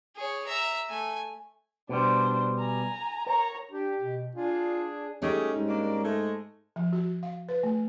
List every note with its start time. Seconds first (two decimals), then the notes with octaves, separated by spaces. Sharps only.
0.17 G#4 C#5
0.47 E5 A#5
0.90 A3 G#5
1.89 B2 G3 D4 C5
2.59 G#5 A#5
3.26 A#4 C#5 A#5
3.71 D4 G4
3.99 B2
4.35 D4 F4 G#4
5.22 G3 A3 C#4 D#4 G4 G#4
5.56 G#2
5.68 A#3 D4
6.04 G#3 A3
6.76 F3
6.93 F#4
7.23 F5
7.49 B4
7.63 A3